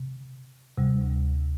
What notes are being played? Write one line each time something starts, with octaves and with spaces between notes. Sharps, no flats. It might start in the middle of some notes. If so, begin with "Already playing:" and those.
Already playing: C3
D2 C3 G3